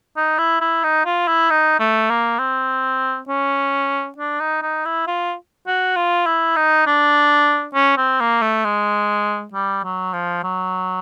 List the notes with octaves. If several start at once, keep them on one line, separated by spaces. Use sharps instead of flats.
D#4
E4
E4
D#4
F4
E4
D#4
A3
A#3
C4
C#4
D4
D#4
D#4
E4
F4
F#4
F4
E4
D#4
D4
C#4
C4
A#3
A3
G#3
G3
F#3
F3
F#3